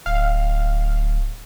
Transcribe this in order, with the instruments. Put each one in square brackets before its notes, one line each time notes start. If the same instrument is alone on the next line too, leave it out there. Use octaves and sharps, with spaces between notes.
[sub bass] D1 [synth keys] F5